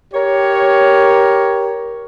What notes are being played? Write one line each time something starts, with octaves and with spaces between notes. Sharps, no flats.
G4 A#4 C#5